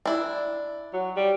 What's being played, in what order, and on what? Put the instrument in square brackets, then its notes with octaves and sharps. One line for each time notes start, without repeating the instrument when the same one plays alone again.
[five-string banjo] D4 E4
[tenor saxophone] F#3
G3